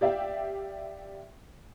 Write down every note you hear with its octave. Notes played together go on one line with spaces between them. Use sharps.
G4 D5 E5 F5 G5